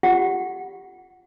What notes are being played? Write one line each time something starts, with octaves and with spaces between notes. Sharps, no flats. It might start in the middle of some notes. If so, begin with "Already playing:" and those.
F4 G4 F#5